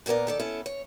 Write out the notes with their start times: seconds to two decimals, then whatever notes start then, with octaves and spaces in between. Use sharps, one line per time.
0.06 A#2 A#3 B3 A#4 D5
0.27 D#3 A4 D5
0.40 B3 C#4 E4 A4
0.66 C#5